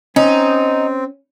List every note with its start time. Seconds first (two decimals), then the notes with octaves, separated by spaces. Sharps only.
0.16 C4 C#4 D#4